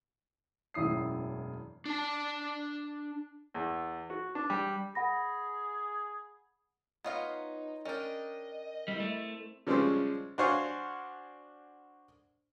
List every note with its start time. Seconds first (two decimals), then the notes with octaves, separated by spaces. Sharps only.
0.74 E1 A1 F#2 E4 D#6 C7
1.85 D4 A5
3.54 E2
4.10 F#4
4.35 D4
4.50 G3
4.95 G#4 F#5 B5 A#6
7.04 B3 D#4 F4 C#5 D#5 F5 C6
7.85 C#4 D4 A#4 D5 D#5 G5
8.88 G3 C4 E4
9.00 A3 D7
9.67 C#3 F3 G3 G#3 C4 C#4
10.38 D4 F#4 C5 C#5 F5 G#5